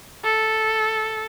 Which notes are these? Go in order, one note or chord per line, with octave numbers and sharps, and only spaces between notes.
A4